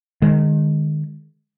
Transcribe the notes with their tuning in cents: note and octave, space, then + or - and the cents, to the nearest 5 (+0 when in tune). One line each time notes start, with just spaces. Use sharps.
D#3 -30 G#3 +0